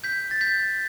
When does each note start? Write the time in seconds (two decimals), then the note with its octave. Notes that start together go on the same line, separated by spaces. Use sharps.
0.04 G6 B6
0.31 A6
0.41 G6 B6